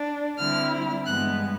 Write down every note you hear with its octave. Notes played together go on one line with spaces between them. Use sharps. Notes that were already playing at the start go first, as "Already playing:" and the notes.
Already playing: D4
D3 G3 C4 E4 F6
G2 E3 G#3 B3 F#6